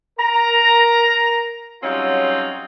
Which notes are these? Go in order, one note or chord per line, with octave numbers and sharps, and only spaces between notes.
A#4 A#5
F#3 G3 C4 C#4 D#4 F4